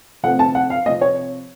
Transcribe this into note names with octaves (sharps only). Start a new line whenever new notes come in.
C3 F3 A3 C4 F#5
A5
F#5
F5
C3 F3 C4 D#5
C#5